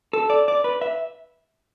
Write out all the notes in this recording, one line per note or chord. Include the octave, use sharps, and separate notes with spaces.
A4
D5
D5
B4
E5